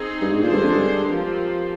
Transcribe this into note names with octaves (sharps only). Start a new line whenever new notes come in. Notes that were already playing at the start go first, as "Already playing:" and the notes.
Already playing: C4 D#4 G#4
G2
G#2
A#2 D3 G#3 D4 G#4 C5
G2
F2
G2
F3 C4 G4 A#4